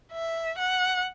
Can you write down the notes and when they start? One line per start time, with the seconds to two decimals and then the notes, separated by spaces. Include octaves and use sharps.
0.12 E5
0.58 F#5